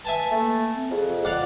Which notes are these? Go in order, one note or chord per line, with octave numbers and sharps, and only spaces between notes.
B4 E5 G#5 A5
A3 A#3
C4
F2 G#4
F4 D5 F5 F#5